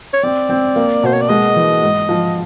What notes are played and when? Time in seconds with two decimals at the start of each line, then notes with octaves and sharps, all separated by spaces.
0.13 C#5
0.23 C4 D5
0.49 C4
0.76 A#3
1.03 B2 C5
1.13 C#5
1.21 D5
1.29 G#3 D#5
1.56 E3
1.82 G#2
2.09 F3